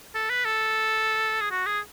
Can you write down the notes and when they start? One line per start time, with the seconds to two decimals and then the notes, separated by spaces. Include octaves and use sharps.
0.15 A4
0.30 B4
0.45 A4
1.41 G#4
1.51 F#4
1.66 G#4